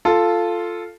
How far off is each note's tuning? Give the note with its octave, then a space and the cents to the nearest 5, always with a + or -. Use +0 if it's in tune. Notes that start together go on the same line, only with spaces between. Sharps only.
F4 -5 A4 +0